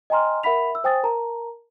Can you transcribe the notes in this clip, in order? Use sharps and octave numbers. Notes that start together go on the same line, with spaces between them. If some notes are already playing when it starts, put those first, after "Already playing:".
D#5 G5 G#5 A#5 C6 F6
A#4 E5 F#5 B5 B6 F7
E5 E6
C5 G5 G#5 D#6 A6
A#4 A5 A#5